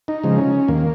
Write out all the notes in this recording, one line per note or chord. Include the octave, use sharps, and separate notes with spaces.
D#4
C#3 F3 G#3
C#4
D#2 A#3